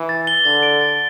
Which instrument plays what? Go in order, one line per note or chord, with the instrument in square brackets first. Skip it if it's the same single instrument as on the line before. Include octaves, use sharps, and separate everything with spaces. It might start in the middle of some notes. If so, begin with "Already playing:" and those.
Already playing: [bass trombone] E3
[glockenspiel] A6
G7
[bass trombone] D3 [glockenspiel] A6
[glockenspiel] D7
A6